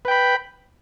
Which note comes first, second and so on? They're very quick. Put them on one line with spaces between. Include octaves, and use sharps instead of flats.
B4 G5 B5